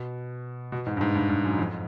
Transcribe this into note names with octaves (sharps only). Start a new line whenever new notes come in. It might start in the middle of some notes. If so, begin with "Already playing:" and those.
Already playing: B2
B2
G#2
G2
G#2
G2
G2
F#2
F2